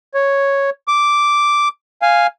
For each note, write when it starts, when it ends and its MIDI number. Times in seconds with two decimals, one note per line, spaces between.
0.14 0.70 73
0.88 1.68 86
2.02 2.27 77
2.02 2.27 80